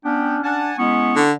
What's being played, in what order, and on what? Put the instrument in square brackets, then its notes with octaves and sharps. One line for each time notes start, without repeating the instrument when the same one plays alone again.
[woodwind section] B3 G5 [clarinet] C#4 [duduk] D4
[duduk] D4 [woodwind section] F#5 G#5 A5
[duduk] G#3 [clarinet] B3 [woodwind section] C#4 E4 C#6
[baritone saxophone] D3